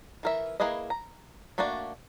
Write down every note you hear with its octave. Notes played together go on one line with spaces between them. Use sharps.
E3 A#4 E5
A#3 E4 G#4 B4 D#5
A#5
A3 A#3 D4 F#4 D5